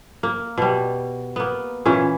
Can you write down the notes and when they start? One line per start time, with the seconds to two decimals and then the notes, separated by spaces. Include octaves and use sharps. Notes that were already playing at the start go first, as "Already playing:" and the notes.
0.23 A#3
0.58 B2 G3
1.36 A#3 B3
1.86 A#2 E3 C#4 E4